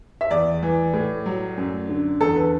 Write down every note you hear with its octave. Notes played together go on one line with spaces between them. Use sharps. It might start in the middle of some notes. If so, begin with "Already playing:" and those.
E5
E2 D5
E3
A2
F#3
F#2
D3
E2 A4
B4